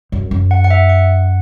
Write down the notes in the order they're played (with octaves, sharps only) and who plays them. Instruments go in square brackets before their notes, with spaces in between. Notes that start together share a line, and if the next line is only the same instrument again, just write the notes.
[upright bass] F#2
F#2
[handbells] F#5
F#5
E5
F#5